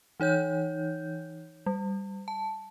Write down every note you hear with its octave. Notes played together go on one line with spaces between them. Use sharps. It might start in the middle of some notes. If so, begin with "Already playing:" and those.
E3 D#4 C#5 G6
G3
A5